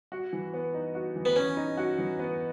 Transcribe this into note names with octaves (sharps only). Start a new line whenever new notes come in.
F#4
E3
B3
D#4
F#4
E3
B3
B3 C#4
D#4
F#4
E3
B3